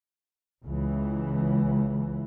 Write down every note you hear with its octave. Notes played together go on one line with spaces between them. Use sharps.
C#2 E3